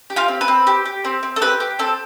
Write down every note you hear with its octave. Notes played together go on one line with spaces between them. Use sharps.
G4
F4 F5
C4
B4
C4
G4
G4
C4
C4
A4
G4 B4
G4
C4 A4